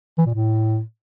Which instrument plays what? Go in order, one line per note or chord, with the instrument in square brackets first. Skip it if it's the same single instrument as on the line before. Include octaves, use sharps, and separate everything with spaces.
[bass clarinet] E3
A#2
A2